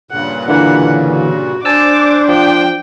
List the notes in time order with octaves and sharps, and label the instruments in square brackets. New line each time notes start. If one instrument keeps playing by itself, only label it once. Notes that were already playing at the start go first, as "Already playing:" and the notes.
[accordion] G2 A#2 C#3 [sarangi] F#5
[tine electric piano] D3 E3 A#3 [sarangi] F#5
[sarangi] F#4
[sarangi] D4 [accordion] C5 [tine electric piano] G#5 A5 E6 [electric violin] D6
[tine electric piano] F3 [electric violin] G5